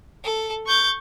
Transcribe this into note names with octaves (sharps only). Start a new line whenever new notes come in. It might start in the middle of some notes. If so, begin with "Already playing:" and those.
A4
C#6 G6 A6